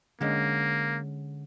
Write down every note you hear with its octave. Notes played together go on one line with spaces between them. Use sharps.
D3 G#3 A#3 C#4